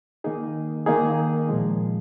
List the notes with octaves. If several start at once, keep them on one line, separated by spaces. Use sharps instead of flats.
D#3 A#3 D#4 G#4
D#3 A#3 D#4 G#4
A#2 F3 G#3